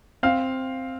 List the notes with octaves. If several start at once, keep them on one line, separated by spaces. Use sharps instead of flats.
C4 F5